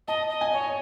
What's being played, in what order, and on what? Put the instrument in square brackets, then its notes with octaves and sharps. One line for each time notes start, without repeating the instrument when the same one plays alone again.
[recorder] D#5 [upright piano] A5
[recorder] D#5
[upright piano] G#5
[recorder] C#5